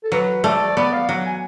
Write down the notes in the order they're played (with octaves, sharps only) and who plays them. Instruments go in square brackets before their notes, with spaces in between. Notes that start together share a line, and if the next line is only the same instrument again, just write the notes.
[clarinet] A4
[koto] F#3 [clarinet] B4
[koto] A3 [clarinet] D5
[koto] B3 [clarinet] D5
[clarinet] F5
[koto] F#3 [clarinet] F#5
[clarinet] G#5